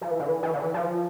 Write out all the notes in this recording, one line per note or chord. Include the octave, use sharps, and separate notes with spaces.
F3
E3
D3
E3
E3
D3
E3
F3